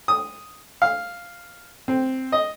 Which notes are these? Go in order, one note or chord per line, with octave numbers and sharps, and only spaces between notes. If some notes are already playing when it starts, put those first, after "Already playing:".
D#6
F5
C4
D#5